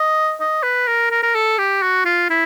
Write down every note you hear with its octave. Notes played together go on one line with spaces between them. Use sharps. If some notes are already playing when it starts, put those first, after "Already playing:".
Already playing: D#5
D#5
B4
A#4
A#4
A#4
A4
G4
F#4
F4
E4